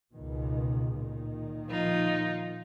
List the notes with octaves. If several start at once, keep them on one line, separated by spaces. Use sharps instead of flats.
C#2 B2 D#3
A#2 D#3
F3 D#4 F4